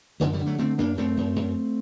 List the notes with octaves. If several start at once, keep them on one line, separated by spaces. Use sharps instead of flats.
F#2 D3 F#3
D#3 G3
D3
F#3 A3
D3 A3 C4
F#2 A#3 D4
F#2 A3 C4
F#2
F#2